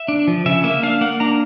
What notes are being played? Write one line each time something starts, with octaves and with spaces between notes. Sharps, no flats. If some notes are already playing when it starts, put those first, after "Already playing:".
Already playing: E5
D4
F3
C#3 E5
A#3 E5
D4 F5
A#3 F#5
D4 A#5